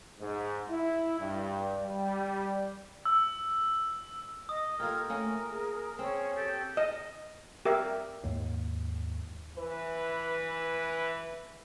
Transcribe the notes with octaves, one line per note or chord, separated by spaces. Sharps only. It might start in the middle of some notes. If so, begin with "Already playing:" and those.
G#2
E4
G2
G3
E6
D#5 D#6
A#3 F4 G4 A4 A#4 F6 G#6
A3 A#3 C#4 A#4
G#4
C4 C#4 G#4 C#5
G4 A4 G5
D#5
G4 A#4 E5
D#2 G#2
E3 B4